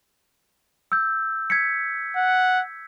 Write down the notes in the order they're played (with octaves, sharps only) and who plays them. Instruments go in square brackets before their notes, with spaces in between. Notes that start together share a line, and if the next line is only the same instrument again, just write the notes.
[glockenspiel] E6 G6
G#6 B6 C#7
[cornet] F#5